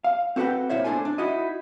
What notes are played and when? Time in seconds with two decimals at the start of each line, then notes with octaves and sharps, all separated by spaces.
0.04 F5
0.36 C4 F#4 A4 B4 F#5 G5
0.69 A#2 E4 C5 C#5 E5
0.84 A2 D4 F4 A4 C5 G#5
1.05 D4
1.18 D#4 E4 F#4 D#5